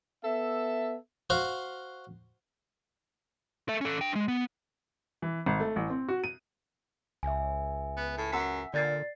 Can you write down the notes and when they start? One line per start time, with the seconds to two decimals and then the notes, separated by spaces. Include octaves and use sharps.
0.24 B3 A4 E5
1.30 F#4 C5 F5
3.69 A4 E5
3.81 C#4 A4
4.01 D4 G5
4.15 G#3
4.28 B3
5.22 E3
5.46 G#1
5.60 A3
5.76 A1
5.90 C4
6.08 F#4
6.24 D#7
7.23 C#2 E5 G#5
7.97 B3
8.18 A2
8.32 F#2 F#5 E6 B6
8.74 A#2 D3 D5 A6 C7